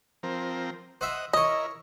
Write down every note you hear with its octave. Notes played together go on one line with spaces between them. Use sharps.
F3 C4 A#4
C5 D#5 E5 F#5
E4 A#4 C#5 D#5 D#6